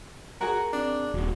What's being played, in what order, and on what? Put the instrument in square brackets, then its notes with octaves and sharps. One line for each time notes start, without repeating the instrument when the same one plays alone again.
[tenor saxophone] F#4 [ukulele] G#4 A#4
[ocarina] C4 [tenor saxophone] D4
[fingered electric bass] D#1 [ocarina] F#4